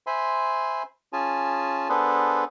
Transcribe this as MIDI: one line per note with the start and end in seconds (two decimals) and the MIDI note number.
0.07 0.83 72
0.07 0.83 76
0.07 0.83 80
0.07 0.83 83
0.07 0.83 84
1.13 1.88 61
1.13 1.88 65
1.13 1.88 68
1.13 1.88 80
1.13 1.88 81
1.89 2.44 59
1.89 2.44 62
1.89 2.44 68
1.89 2.44 69
1.89 2.44 71
1.89 2.44 72